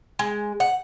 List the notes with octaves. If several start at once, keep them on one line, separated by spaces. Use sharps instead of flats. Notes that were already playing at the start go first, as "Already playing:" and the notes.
G#3
F#5